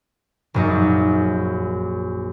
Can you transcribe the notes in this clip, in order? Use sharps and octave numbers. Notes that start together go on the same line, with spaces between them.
A#1 F#2 D#4